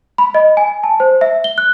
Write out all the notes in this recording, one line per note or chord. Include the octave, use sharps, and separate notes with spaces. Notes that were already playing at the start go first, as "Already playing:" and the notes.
B5
D#5
G#5
A5
C5
E5
G7
F#6